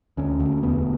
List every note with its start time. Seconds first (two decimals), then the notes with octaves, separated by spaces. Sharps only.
0.17 D2 C#4
0.40 D2
0.63 E1 B3